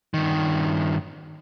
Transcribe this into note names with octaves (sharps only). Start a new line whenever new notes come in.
G2 D#3